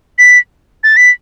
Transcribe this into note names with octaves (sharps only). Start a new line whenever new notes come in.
B6
A6
B6